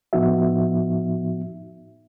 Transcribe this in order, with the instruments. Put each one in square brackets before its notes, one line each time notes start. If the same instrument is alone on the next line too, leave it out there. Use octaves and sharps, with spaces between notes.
[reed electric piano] A2 F3 B3 D#4 F#4 E5